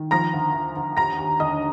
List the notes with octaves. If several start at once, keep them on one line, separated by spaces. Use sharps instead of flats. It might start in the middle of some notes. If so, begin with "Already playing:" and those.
Already playing: D#3
F3 A#5 A#6
D2
D2
D2
D#2 A#5 A#6
D#2
D3 D#5 D#6